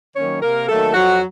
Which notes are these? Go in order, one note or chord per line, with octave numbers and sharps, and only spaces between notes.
D#3 F#3 A#3 C#4 C#5
C3 A#3 A#4
D#3 F#3 A3 A#3 A4
F2 F#3 F#4